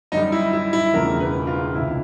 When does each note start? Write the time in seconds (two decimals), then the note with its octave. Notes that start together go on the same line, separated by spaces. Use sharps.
0.12 F#2 D3 G3 D#4
0.32 E4
0.53 E4
0.73 E4
0.93 E1 E2 C#3 F3 A3 A#4
1.20 B4
1.47 F4
1.74 C#2 C3 D#3 E4